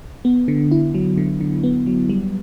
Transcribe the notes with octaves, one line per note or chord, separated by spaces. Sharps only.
B3
D3
E4
F#3
D3
D3
B3
F#3
G3